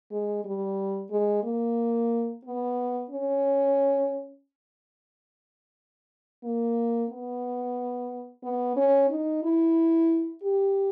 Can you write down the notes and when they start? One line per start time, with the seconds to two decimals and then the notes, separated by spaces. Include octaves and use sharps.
0.11 G#3
0.45 G3
1.10 G#3
1.43 A#3
2.44 B3
3.10 C#4
6.44 A#3
7.09 B3
8.43 B3
8.76 C#4
9.10 D#4
9.43 E4
10.43 G4